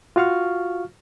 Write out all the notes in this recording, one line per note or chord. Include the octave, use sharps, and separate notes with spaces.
F4 F#4 F5 C#6 F6